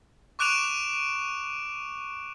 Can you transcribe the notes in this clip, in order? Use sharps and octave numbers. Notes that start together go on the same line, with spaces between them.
C#6 D6 F#6 D7 E7 F7